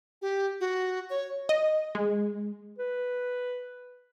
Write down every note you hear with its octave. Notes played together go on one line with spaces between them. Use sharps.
G4
F#4
C#5
D#5
G#3
B4